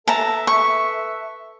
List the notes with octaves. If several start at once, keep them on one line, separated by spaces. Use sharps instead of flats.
A4 B4 E5 A5 A#5
C#6